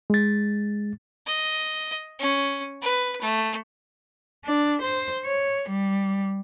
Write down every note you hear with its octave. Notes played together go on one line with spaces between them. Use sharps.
G#3 A6
D#5
C#4
B4
A3
D4
C5
C#5
G3